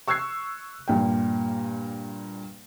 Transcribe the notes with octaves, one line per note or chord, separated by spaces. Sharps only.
C#6 E6 F#6 G#6 C7
G2 A#2 G5